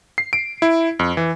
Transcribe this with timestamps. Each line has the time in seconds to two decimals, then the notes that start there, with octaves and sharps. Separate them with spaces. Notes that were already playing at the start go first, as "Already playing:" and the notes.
0.18 C7
0.33 D7
0.62 E4
0.99 F2
1.17 E3